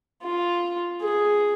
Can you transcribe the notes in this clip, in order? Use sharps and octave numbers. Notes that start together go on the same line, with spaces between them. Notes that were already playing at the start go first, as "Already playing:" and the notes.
F4
G#4